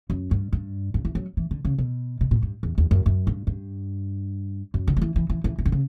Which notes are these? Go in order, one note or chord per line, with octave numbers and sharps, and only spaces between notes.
F#2
G2
G2
G2
E3
F#3
E3
D3
C#3
B2
B2
A#2
G2
E2
E2
F#2
F#2
G2
G2
F#2
D3
F#3
E3
E3
E3
E3
E3
D3
C#3